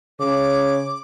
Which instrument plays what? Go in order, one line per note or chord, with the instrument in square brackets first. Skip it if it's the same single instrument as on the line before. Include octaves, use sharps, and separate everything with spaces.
[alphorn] C#3 [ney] C#5 [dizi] D6